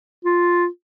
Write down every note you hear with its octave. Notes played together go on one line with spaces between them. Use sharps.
F4